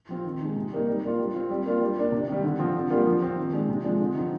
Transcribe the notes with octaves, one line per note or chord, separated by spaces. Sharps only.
F3 C4 F4
D#3
G#3 D#4
C3
G3 A#3 D#4
G3
A#3 D4 F4
G3
C4 F4
G3
A#3 D4 F4
G3
A#3 D4
C3
D#3 G3
D3
F3 C4 F4
D3
G3 A#3 F4
F3
C4 F4
D#3
G#3 D4
C3
F3 G#3 D4 F4
D3
F3 C4 D#4